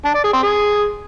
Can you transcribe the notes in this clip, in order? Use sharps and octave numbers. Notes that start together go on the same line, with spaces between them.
D4
D5
G#4
C4
G#4